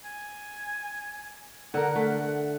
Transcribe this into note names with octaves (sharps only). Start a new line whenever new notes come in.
G#5
D3 A#4 F#5
A3